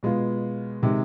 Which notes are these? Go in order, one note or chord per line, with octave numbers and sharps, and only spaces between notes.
B2 G#3 B3 F4
C3 D#3 G#3